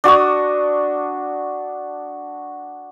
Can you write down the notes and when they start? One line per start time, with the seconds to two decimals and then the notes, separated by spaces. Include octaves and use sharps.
0.04 D4 F#4 C#6 D#6